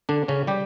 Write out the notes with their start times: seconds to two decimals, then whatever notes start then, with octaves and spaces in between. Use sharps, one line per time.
0.09 D3 D4
0.28 C#3 C#4
0.47 G3 G4